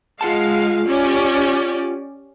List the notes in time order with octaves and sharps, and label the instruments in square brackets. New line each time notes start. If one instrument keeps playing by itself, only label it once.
[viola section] G#3 F5 [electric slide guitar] F4 F#5 A5
[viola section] C#4 G4 D5